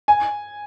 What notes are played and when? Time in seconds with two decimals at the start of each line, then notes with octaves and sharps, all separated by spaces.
0.08 G#5